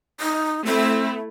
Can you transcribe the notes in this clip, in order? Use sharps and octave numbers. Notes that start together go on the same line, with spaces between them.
D#4
A3 C4 E4